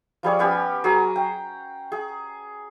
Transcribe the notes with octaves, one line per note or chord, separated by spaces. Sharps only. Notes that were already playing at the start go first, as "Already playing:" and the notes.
F3 G3 G#4 C#5
B3 C#4 G4 G#5
F#3 G#4 A#5
G5
G#4